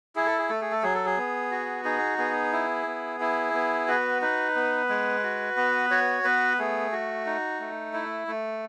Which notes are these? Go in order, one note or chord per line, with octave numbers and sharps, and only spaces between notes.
E4 G#4
A4
G#4
A3 A4
G#4
A4
F#3 G#4
A4
G#4
B3
F#4
D#4 G#4
B3 G#4
E4
B3
E4
B3
F#4 B4
D#4 B4
B3
G#3
F#4
B3
F#4 C#5
B3 B4
A3 G#4
F#4
D#4
A3
E4
A3